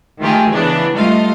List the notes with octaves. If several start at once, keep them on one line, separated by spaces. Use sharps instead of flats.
D#3 A3 F4 G4 G#4
C#3 E3 B3 D4
G3 A3 F4 D#5 F5